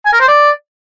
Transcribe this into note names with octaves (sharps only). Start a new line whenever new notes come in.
G#5
A#4
C5
D5